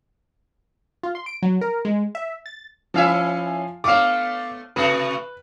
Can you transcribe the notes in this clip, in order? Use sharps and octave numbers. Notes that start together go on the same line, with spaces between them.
F4
C6
D7
F#3
A#4
G#3
E5
A6
F3 C#4 E4 E5 F5 G#5
A3 B3 F5 D6
C3 A3 F#4 B4